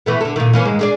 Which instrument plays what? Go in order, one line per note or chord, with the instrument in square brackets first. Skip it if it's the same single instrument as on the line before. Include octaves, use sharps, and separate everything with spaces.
[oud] E3 A3 B3
D3 A4
A#2 D#3
E3 A#3 C#4
G#2 D#3 G#3
D4 G#4 D5